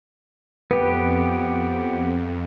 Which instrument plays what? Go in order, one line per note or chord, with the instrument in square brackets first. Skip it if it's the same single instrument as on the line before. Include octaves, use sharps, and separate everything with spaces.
[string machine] F2 [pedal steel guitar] B3 G4 [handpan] B4